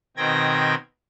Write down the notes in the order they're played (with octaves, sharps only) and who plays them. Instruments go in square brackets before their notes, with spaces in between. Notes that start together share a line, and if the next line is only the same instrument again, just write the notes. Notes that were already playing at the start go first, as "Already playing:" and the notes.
[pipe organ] B2 D#3 C4 G5 G#6 A#6